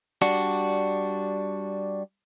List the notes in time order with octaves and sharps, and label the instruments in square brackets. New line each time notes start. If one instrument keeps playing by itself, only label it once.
[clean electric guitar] G3 D4 F#4